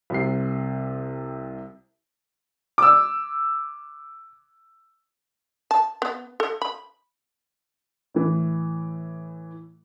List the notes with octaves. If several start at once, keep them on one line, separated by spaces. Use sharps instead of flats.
C2 C3 C7
D6 E6
A5
B3
A4
B5
A2 E3